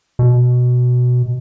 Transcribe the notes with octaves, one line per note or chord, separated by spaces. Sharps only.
B2